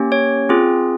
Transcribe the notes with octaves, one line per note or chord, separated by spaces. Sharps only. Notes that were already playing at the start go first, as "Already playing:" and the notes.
Already playing: A#3 C#4 G4
C#5
C4 F4 G#4